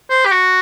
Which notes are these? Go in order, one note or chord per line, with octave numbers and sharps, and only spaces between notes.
C5
G4
F#4